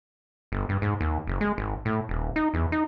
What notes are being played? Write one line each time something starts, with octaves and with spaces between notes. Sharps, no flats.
G1
G2
G#2
D#2
F#1
G#3
G#1
A2
D#1
D#4
E2
D#4